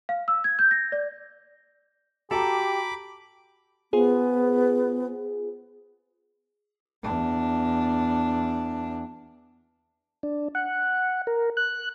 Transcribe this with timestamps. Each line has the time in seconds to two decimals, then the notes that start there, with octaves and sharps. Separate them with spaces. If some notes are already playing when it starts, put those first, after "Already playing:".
0.09 F5
0.28 E6
0.44 G#6
0.59 G6
0.71 A#6
0.92 D5
2.31 F#4 G4 A4 A#5 B5 D6
3.93 B3 F4 G#4 C5
7.03 E2 D4
10.23 D4
10.55 F#5
11.27 A#4
11.57 F#6